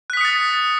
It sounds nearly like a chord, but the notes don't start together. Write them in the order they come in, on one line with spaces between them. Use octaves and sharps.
F#6 B6 D#6 C#7 A6